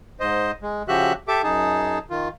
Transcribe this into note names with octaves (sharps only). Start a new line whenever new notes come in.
G#2 C5 D#5
G#3
C#3 F3 F#4 G4 E5 F#6
G4 A4 E5 D6
F#2 D#4 G#4 A5
D#3 F4